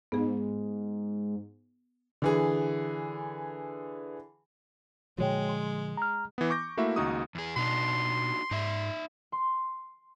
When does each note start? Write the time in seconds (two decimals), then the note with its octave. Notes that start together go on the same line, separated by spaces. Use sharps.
0.12 G#2 B3 G#4
2.22 D3 E3 G#4
5.18 A#2 D3 F3 G#3 F#4 C#5 G5
5.49 C6
5.97 A#5 F6
6.38 E3 B3
6.50 C#6 D6 G6 A#6
6.77 A3 A#3 E4 F#4 E5
6.96 C#2 D#3 A#3 D#4 F#4 D#6
7.35 E2 G#4
7.57 B2 D4 D#4 F#4 C6
8.51 G#2 D#4 D5 E5
9.32 C6